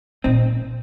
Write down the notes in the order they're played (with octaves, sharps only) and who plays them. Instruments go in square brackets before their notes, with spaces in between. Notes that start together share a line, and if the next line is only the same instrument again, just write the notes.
[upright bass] A#2 [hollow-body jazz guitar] C4 D#4